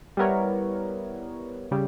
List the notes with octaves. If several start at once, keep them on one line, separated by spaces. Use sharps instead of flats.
G3 B3 E4 A#4 C#5
C#3 G3